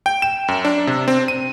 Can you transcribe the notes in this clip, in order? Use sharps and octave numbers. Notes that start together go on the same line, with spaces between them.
G5
E7
F#2
D4
C3
C4
D#7